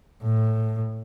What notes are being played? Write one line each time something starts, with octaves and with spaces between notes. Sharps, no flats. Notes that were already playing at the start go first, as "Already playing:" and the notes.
A2